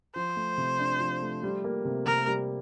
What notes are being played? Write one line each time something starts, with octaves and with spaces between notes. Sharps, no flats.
F3 C5
A3
C3
D4
F3
A3
G3
A#3
C3
C3 A#4
G3